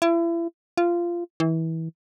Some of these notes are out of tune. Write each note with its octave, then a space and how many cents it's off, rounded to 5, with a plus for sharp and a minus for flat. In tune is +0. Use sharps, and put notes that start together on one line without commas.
E4 +35
F4 -15
E3 -25